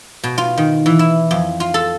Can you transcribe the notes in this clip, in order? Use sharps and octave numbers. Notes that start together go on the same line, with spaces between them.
B2
F4
D#3
E3
E4
F2
F4
A4